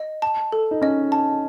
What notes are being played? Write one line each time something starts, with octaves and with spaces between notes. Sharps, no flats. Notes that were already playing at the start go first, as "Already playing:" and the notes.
Already playing: D#5
A5
A4
D#4
C#4 D#5
A5